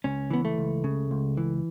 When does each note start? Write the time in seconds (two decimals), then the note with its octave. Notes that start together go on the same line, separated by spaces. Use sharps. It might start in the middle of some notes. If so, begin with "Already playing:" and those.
0.04 C#2 C#4
0.31 E3 B3
0.45 A3
0.58 C#2
0.84 C#3
1.11 C#2
1.37 E3